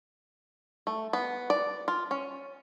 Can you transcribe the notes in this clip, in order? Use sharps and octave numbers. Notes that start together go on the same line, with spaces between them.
A3
B3
D5
F4
C#4